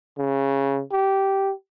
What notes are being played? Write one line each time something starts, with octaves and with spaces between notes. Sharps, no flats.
C#3
G4